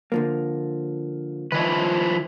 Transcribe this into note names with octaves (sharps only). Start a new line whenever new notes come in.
D3 F3 A#3
D#3 F3 E4 B4 D#5